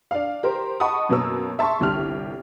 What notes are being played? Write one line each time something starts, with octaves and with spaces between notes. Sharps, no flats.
D4 F5
G4 A#4 C5
D#5 F#5 A5 B5 C#6 D#6
F#2 B2 F#3 A#3 A#4 E6
E5 A5 C6 C#6
G1 C2 D3 G4 F6